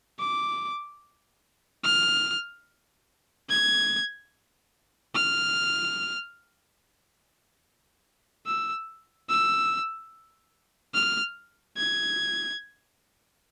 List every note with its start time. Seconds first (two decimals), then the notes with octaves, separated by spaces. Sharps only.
0.19 D6
1.84 F6
3.49 G#6
5.15 F6
8.47 E6
9.29 E6
10.95 F6
11.77 G#6